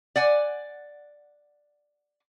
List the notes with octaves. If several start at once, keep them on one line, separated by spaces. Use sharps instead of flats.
D5 F#5 G#5